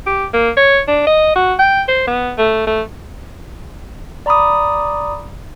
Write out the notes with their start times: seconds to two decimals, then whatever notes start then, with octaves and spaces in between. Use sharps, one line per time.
0.07 G4
0.34 A#3
0.57 C#5
0.88 D4
1.07 D#5
1.36 F#4
1.59 G5
1.88 C5
2.07 B3
2.38 A3
2.67 A3
4.26 D5 A#5 B5 D6 D#6